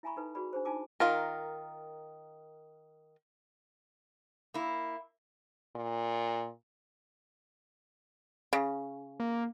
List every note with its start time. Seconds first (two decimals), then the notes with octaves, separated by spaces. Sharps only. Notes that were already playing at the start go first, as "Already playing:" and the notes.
0.03 E4 E5 G#5 A#5 B5 C#6
0.16 D#4 A4 B4
0.35 F#4 G#4 B4 D5 B5
0.53 D4 G#4 C5
0.65 D4 D#4 F4 G#5 A5 D6
1.00 D#3 F4 A#4
4.54 A#3 E4
5.75 A#2
8.53 C#3
9.20 A#3